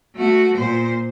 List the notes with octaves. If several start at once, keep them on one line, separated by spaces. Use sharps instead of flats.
A3 F#4
A#2 C5